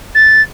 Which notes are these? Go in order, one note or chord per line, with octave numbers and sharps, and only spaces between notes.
A6